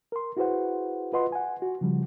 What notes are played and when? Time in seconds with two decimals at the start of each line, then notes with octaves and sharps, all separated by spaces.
0.12 A#4 C6
0.37 E4 F#4 G#4 B4 C5 F#5
1.13 F4 B4 D#5 F#5 C6
1.32 F#5 G#5
1.62 F#4
1.81 C#3 F3 G3